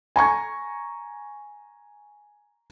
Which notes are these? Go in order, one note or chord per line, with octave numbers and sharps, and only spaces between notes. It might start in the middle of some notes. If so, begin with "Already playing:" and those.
G#5 A#5 C#6 G#6